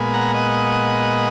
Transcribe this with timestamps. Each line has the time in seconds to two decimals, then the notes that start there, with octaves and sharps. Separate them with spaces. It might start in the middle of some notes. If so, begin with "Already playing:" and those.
Already playing: A#2 G#3 B3
0.14 F#5 A#5
0.35 D#5 F#5